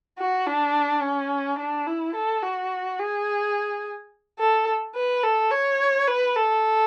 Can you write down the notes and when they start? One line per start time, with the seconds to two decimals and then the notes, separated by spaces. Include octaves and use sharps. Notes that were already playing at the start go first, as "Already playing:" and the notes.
0.19 F#4
0.47 D4
1.03 C#4
1.59 D4
1.87 E4
2.15 A4
2.43 F#4
2.99 G#4
4.39 A4
4.95 B4
5.23 A4
5.51 C#5
6.08 B4
6.36 A4